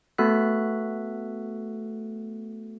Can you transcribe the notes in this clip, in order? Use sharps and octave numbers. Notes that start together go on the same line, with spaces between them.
A3 B3 F#4 A4 F#6 B6